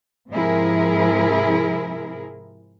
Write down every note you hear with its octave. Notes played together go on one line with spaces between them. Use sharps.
G#2 C3 F3 E4 G#4 A#4